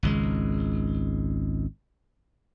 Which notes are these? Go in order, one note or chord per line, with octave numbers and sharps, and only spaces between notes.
G#1 C#2 G#3